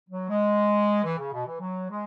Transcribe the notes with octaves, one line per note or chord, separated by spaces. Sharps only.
F#3
G#3
E3
C#3
B2
E3
F#3
G#3